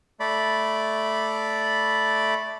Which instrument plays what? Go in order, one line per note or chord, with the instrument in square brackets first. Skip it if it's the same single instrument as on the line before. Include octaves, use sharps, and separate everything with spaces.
[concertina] A3 D5 B5